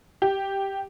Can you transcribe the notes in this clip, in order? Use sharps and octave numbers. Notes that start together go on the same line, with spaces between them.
G4